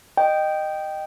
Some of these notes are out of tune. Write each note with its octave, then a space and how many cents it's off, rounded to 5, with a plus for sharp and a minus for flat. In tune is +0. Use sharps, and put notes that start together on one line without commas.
D#5 -15 G5 -5